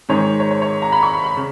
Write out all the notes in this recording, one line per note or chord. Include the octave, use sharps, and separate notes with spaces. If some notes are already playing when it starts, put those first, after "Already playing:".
G#2 D#3 G#3 C#5
C#5
C#5
C#5
A#5
B5
C#6
B5
B5
C#3